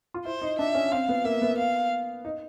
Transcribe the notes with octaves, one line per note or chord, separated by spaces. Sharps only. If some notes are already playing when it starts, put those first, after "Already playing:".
F4
E4 C5
D#4
D4 E5
C#4
C4 F5
B3
A#3 E5
B3
F5
D#4